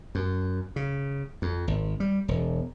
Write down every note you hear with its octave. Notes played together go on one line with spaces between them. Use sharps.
F#2
C#3
F2
G#1
G3
E1